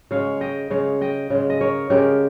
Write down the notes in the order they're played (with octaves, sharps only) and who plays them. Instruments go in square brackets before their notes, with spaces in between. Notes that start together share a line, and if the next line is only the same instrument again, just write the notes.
[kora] C#3 G#3 C#5 F5
D#5 G5
C#3 G#3 C#5 F5
D#5 G5
C#3 G#3
D#5
A#4 C#5
C#3 G#3 G4 A#4